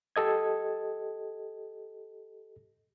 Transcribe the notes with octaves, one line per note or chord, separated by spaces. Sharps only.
G4 A4 D#5 G#6